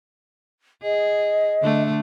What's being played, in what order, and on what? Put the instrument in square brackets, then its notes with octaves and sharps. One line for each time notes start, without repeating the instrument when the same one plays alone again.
[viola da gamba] G#4 [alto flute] D#5
[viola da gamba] D3 A3